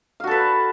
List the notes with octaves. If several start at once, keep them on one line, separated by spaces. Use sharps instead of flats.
F#4 A4 B4 F5